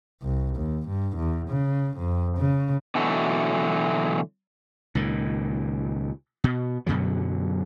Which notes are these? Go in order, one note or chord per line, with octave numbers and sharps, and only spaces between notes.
C2
D#2
G2
E2
C#3
F2
C#3
B2 D3 E3 F#3 A3
C#2 A#2 D#3
B2
F#2 B2 D3 F#3